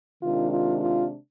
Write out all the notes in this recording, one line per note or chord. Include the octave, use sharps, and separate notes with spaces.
C3 D#3 G#3 D4 F4
F4
F4